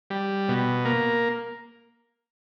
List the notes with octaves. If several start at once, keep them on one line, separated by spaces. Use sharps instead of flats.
G3
B2
A#3